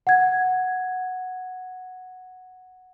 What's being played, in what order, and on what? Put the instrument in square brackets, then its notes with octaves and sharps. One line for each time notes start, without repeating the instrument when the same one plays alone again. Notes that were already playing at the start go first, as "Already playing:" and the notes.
[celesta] F#5 G#6